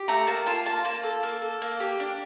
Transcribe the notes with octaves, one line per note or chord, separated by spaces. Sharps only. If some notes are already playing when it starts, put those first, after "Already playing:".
Already playing: G4
A3 A#5
A#3 A5
F4 A5
A#3 A5
A#3 A5
A4
A#3
A4
A#3
G4
D4